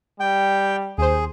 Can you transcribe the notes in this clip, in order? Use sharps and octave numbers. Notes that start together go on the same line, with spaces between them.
G3 G5
D#2 G#4 C5